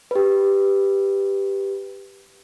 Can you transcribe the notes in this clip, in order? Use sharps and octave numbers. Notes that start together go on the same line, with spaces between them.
G4 B4